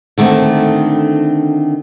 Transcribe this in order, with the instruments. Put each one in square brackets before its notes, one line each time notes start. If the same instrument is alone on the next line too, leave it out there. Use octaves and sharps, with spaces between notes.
[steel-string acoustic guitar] D3 D#3 A3 C4